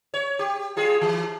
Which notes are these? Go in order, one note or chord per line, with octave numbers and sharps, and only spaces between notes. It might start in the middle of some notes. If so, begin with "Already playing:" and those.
C#5
G4
G3 F4 G#4
E3